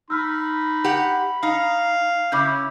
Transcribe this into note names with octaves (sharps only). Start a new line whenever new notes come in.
D#4 B5 E6 F6 B6
G4 F#5
D#4 F5
C#3 C#4 E4 D6 G6